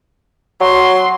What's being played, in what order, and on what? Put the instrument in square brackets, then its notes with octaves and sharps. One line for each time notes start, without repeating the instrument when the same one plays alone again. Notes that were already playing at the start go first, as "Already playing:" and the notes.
[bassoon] F#3 [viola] C6